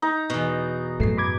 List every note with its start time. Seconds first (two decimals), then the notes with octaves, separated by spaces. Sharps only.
0.02 D#4 A#5
0.30 E2 B2
1.00 F#2 A2 A3 C7
1.18 B5 D6 G#6